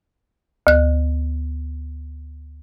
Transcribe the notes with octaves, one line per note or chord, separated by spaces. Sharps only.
D2 F#6